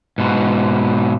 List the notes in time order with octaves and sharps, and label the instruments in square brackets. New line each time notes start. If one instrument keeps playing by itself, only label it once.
[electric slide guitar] G#2 B2